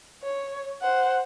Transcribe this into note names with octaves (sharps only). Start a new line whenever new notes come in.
C#5
C5 F#5